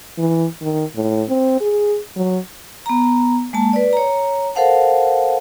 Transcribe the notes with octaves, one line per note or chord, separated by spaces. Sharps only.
E3
D#3
A2
C4
G#4
F#3
B3 A#5
G#3 A#3 A5
B4 D5
C#5 A#5
A4 A#4 C5 F5 F#5 A5